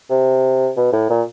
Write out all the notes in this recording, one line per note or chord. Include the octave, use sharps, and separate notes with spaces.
C3
B2
A2
A#2